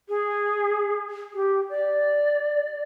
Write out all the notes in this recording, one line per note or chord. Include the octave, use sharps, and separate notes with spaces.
G#4
G4
D5